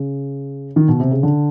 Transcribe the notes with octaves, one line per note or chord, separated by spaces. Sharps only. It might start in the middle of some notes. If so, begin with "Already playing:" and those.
Already playing: C#3
D#3
B2
C3
C#3
D3